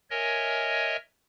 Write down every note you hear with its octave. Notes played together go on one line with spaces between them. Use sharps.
A#4 C#5 D#5 E5 G#5